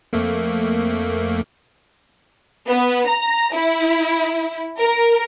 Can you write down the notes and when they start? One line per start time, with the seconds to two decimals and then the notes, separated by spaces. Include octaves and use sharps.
0.13 F2 A3 A#3
2.69 B3
3.07 A#5
3.53 E4
4.78 A#4